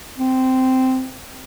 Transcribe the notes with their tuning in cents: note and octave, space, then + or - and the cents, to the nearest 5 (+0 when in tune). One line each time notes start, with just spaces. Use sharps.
C4 -10